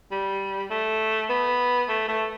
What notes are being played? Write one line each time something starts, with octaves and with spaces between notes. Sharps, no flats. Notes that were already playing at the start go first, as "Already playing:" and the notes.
G3
A3
B3
A3
A3